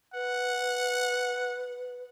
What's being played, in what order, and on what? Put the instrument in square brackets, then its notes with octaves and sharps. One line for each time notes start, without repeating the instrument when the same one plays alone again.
[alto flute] B4 [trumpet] F#5